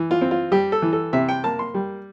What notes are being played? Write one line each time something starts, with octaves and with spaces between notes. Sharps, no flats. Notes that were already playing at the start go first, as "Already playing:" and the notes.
Already playing: E3
F4
C4
F4
G3 G4
A4
E3
A4
C3 E5
G5
A#3 A5
C6
G3